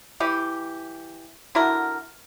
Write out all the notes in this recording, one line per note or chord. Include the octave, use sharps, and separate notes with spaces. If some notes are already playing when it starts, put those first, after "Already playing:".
E3 G4
D3 E4 F#4 A#4